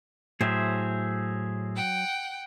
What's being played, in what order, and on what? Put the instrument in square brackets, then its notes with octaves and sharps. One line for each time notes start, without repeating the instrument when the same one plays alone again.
[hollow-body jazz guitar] A2 [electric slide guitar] F#3 [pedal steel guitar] G#4 C5 E5
[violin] F#5 G5